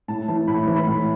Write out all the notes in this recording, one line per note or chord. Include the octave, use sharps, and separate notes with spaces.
A2 A5
E3 A5
A2 B5
E3
B5
A2